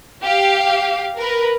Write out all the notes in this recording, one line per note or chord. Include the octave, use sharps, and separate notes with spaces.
G4 F5
A#4 B4